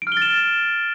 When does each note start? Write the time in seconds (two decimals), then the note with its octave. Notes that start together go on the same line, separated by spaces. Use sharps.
0.02 D7
0.07 F6
0.12 G7
0.17 A6
0.22 E7